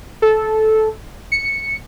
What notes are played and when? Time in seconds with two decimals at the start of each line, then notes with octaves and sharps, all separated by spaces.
0.22 A4
1.32 C#7